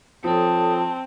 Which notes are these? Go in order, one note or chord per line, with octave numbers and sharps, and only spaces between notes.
F3 C4 A4 C#5 A5 D#6